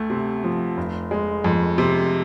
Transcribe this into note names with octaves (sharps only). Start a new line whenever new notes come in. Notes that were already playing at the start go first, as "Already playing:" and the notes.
Already playing: D2 A3
C3
F3
F1
G#3
F2
C3